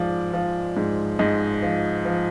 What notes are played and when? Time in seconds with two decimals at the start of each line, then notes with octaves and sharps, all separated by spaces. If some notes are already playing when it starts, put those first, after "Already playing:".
Already playing: G#2 F3 D5
0.33 F3
0.77 G#2
1.19 G#2 D#5
1.62 F3
2.05 F3